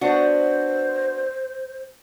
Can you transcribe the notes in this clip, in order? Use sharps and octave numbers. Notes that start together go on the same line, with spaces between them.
B3 D4 F#4 C5